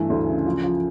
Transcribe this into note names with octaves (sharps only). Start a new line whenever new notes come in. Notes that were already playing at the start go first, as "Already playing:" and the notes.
Already playing: G2 E3 A3 G#5
D2
C#3
F3
F3